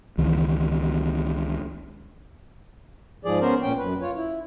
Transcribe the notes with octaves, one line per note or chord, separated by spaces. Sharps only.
C#2 D#3 E3
G#2 F3 G#4 D5
B3 C#4 A#4 C5
A#2 C#4 G5
F#2 B4
F4 C#5
E4